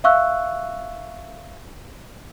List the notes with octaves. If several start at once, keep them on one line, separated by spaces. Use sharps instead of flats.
E5 F5 C#6 E6 F#6